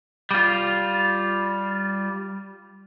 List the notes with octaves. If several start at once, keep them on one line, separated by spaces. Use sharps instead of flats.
G3 F4